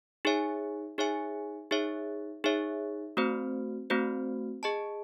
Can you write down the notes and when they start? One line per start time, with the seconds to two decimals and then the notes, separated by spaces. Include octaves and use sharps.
0.25 D#4 G#4 C#5 E5 G#5
0.98 D#4 G#4 C#5 E5 G#5
1.71 D#4 G#4 C#5 E5
2.44 D#4 G#4 C#5 E5
3.17 A3 C4 F#4 C5
3.90 A3 C4 F#4 C5
4.63 G#4 D#5 A5